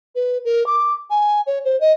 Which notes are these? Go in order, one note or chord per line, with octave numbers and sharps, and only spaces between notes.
B4
A#4
D6
G#5
C#5
C5
D#5